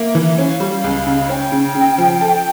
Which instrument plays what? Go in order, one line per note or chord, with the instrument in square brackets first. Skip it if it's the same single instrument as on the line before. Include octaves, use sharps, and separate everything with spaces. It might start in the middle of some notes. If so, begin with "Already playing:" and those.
Already playing: [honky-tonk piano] A#3 [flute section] E5
[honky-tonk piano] E3
[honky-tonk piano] C#4 [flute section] F5
[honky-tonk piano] G3
C#2
C#3
[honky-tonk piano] C#4 [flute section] G5
[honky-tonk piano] C#3
C#3
F3
A4